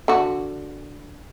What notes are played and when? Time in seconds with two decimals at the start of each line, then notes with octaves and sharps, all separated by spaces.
0.08 D3 F#4